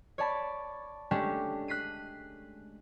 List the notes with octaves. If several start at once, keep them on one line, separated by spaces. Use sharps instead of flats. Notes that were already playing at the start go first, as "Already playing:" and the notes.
C#5 D5 A5 B5
G#3 A3 C#4 D4 G4
F#6 B6 C7 D#7